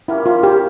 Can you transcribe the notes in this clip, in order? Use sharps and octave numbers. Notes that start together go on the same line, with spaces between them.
A#2 G3 A#3 C#4 E4
F4
G4